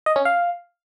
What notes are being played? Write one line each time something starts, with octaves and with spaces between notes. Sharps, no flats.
D#5
C#4
F5